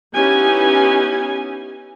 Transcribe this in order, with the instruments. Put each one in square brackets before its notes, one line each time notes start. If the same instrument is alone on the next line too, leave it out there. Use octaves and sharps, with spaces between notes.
[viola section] B3 C#4 D#4 E4 G4 G#5